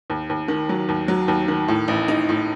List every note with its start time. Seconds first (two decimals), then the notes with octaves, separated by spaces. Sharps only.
0.10 D#2
0.30 D#2
0.48 D#3
0.69 F#3
0.89 D#2
1.08 F#3
1.28 D#2
1.48 D#3
1.68 A2
1.88 A1
2.08 D#4
2.29 A2